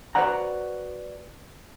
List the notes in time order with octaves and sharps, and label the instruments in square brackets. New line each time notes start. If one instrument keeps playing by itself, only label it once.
[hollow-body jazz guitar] F#4 B4 C5 D5 F#5 A#5